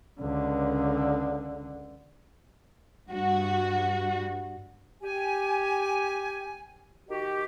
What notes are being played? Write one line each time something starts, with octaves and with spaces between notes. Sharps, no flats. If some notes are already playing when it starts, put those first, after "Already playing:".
C#2 D3
G2 F#4
G4 G#5
D#3 F#4 G4